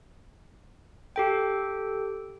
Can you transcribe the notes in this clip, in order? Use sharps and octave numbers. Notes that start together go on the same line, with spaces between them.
G4 A4 G5